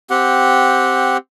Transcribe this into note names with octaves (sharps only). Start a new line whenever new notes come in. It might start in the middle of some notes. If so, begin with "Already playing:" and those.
C4 G4 F#5